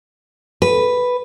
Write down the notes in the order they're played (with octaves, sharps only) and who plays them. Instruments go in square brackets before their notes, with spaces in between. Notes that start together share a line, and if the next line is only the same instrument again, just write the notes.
[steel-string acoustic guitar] B4